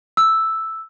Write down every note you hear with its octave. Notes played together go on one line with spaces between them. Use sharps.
E6